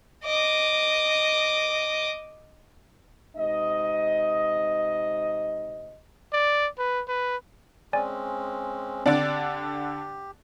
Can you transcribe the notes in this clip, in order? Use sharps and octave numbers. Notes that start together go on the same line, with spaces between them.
D#5 D6
C3 G#3 D#4 D#5
D5
B4
B4
G#3 C4 C#4 D5 G#5
D3 C4 D4 G4 D5 G5